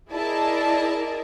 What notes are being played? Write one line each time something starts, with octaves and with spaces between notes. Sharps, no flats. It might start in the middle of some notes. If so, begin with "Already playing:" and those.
E4 G#4 A#4 D5 D#5 A5